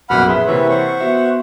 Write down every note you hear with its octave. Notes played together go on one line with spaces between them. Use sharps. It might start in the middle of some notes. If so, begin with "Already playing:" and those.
A#1 F#2 B2 F#5 B5 F6
G#4 B4 E5 C6
C3 E3 A#3 B4 C#5 E5
C5 F#5 C#6
B3 F#4 E5